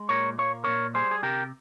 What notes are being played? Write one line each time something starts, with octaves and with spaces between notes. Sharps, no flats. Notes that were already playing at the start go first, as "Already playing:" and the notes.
Already playing: G#3
A#2 A#4 C#5
A#3 C#5
A#2 A#4 C#5
G3 G#4 C5
G#4
C3 G4 A#4